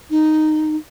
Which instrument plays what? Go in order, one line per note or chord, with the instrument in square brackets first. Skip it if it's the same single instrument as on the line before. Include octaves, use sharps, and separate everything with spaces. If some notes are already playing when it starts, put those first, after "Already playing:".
[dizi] D#4